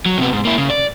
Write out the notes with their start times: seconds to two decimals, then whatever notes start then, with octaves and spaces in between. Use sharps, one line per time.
0.06 F#3
0.18 C3 B3
0.33 G#2
0.45 A#3 E4
0.58 C#3
0.70 D5